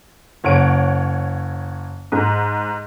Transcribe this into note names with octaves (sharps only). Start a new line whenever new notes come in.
F#1 C#5 F#5 D7
G#2